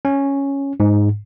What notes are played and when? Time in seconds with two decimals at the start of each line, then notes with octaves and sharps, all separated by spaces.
0.05 C#4
0.80 G#2